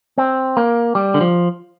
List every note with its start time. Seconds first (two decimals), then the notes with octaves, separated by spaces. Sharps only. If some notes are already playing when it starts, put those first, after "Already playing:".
0.18 C4
0.57 A#3
0.95 G3
1.14 D3
1.21 F3